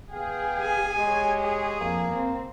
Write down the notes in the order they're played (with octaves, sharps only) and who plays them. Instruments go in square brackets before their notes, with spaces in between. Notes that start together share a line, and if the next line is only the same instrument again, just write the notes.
[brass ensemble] B3 F5 G5 [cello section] G#4
[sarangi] G#5
[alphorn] G#3 [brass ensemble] G4 C#5
[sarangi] G#4
[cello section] F2 [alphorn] A#3
[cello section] C4